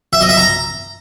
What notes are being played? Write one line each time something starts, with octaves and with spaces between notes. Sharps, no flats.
E5
D#5
E5
A#5